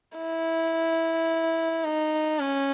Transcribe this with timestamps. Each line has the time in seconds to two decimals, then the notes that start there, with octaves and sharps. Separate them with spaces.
0.17 E4
1.84 D#4
2.39 C#4